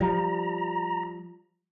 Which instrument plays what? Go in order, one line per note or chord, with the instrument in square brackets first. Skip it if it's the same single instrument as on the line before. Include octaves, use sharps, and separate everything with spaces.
[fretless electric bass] F3 G3 [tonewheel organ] A#5